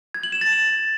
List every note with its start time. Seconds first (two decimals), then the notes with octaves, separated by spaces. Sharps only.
0.14 G#6
0.23 F#7
0.32 E7
0.41 A6